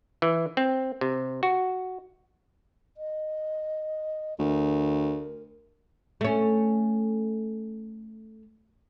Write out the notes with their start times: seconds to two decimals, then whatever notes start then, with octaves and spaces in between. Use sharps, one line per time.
0.22 E3
0.57 C4
1.01 C3
1.43 F#4
2.97 D#5
4.39 D2 A#4
6.21 A3 C#4